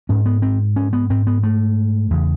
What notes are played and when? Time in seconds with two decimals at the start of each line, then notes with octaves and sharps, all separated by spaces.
0.09 G#2 C#4
0.26 B3
0.42 C4
0.76 C#4
0.93 B3
1.10 G#2 C4
1.27 B3
1.43 A3
2.11 E2 C#3